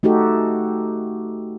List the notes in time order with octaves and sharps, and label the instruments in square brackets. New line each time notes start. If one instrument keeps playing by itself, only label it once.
[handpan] A3 D#4 F#4 G4 A4